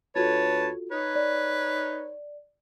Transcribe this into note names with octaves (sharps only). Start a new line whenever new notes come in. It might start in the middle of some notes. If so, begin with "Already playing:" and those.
D2 F4 F#4 A4 B4 C#5 A5
D#4 B4 C#5
D5